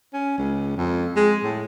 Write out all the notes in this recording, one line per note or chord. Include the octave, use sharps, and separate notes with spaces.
C#4
C#2
F2
G#3
A2